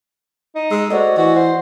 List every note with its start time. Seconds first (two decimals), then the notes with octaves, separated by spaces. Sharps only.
0.55 D#4
0.71 G#3 E6
0.90 A3 F#4 C5 D5 D#5
1.17 E3 F#4
1.36 C5 F#5